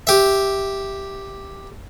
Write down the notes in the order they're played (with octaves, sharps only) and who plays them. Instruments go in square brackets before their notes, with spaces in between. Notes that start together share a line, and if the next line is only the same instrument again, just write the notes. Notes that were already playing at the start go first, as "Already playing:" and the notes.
[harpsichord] G4 E5